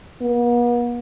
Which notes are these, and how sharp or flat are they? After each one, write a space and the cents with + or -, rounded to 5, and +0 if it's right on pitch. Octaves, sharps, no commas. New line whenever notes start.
B3 -45